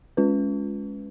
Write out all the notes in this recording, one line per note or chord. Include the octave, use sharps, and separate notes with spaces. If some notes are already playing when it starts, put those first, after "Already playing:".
G#3 C#4 F4 B4